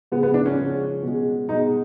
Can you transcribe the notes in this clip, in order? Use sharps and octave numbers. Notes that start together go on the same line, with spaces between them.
C#3 F3 G#3 B3
B3
D4
C#4
C#3 F3 G#3
B2 G#3
B2 G#3 D#4